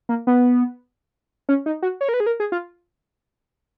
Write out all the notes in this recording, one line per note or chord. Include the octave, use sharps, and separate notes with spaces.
A#3
B3
C#4
D#4
F#4
C#5
A#4
B4
G#4
A#4
G#4
F4